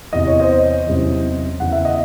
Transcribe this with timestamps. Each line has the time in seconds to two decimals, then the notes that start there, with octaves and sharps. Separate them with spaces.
0.13 E2 C3 E3 D#5
0.27 C#5
0.40 C5 D#5
0.87 E2 C3 F#3 C#4 E4
1.60 E2 C#3 E3 F#5
1.72 E5
1.85 D#5